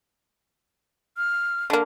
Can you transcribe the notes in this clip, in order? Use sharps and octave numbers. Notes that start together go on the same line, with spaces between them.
F6
D3 A#3